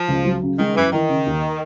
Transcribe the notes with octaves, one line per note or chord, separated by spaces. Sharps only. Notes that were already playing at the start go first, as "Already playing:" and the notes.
Already playing: F3
C#2
F#3
C#3
D#3 G#3
F#2 E3
D#3 E3
C#3
D#2